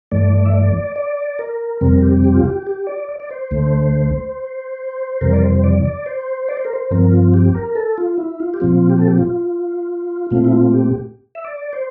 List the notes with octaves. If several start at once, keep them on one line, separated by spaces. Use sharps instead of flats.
G2 E3 A3 D5
E5
D5
D5
A#4
F2 C3 G3 C4 A#4
G4
G4
F4
G4
G4
D5
D5
D5
C5
D2 D3 A3
F2 C3 E3 G3 A#4
D5
C5
D5
D5
C5
D5
C5
A#4
C5
G2 F3 C4 A#4
F4
G4
A#4
A4
F4
E4
F4
G4
A#2 F3 C4 F4
G4
A4
G4
F4
A#2 A3 C4 F4
E4
F4
G4
E5
D5
C5